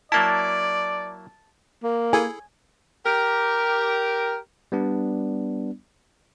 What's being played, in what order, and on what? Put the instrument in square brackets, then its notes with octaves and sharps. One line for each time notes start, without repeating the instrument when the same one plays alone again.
[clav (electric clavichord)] F#3 A#3 E4 [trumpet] D5 [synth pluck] A5
[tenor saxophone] A#3
[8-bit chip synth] E4 G#4 A4 [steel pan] G#5
[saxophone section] G4 A#4
[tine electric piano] G3 B3 D4